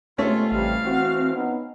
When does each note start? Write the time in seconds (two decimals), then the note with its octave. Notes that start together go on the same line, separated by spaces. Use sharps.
0.18 C3 G#3 A3 B3 C#4 F4
0.52 A1 C3 E3 G3 F5
0.84 E3 C4 F#4
1.33 B3 C#4 D#4